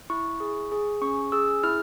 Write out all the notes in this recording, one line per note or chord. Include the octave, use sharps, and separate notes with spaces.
E4 C#6
G#4
G#4
C#4 C#6
G#4 E6
E4 F6